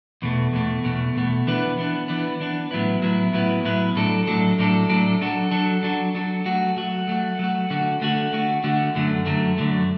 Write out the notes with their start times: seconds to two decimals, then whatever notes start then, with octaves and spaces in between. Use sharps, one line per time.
0.22 E2 B2 A3
0.53 E2 B2 A3
0.84 E2 B2 A3
1.15 E2 B2 A3
1.47 E3 B3 D4 B4
1.78 E3 B3 D4 B4
2.08 E3 B3 D4 B4
2.40 E3 B3 D4 B4
2.71 A2 F#3 B3 E4 B4
3.02 A2 F#3 B3 E4 B4
3.33 A2 F#3 B3 E4 B4
3.65 A2 F#3 B3 E4 B4
3.96 A2 F#3 D4 A4
4.27 A2 F#3 D4 A4
4.59 A2 F#3 D4 A4
4.89 A2 F#3 D4 A4
5.21 F#3 D4 F#4 A4
5.51 F#3 D4 F#4 A4
5.83 F#3 D4 F#4 A4
6.15 F#3 D4 F#4 A4
6.45 F#3 A3 F#4
6.77 F#3 A3 F#4
7.08 F#3 A3 F#4
7.39 F#3 A3 F#4
7.70 D3 A3 F#4
8.02 D3 A3 F#4
8.33 D3 A3 F#4
8.64 D3 A3 F#4
8.95 F#2 D3 F#3 A3
9.26 F#2 D3 F#3 A3
9.58 F#2 D3 F#3 A3